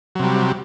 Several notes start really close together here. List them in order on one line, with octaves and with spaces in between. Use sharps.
F#3 C3 G3